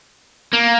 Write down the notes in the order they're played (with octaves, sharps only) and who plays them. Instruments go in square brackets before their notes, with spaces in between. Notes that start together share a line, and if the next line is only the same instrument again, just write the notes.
[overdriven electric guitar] A#3